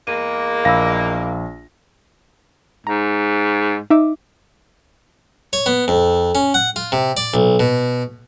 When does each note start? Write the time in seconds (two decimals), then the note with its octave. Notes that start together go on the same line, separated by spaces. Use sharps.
0.07 E2 G#3 A#3 D#7
0.65 A#1 F5 B5 E6 A#6
2.87 G#2 A#5
3.90 D#4 E5 D6
5.53 C#5
5.66 B3
5.88 F2
6.35 C#4
6.54 F#5
6.76 F4
6.92 C3
7.17 D5
7.34 B1
7.60 B2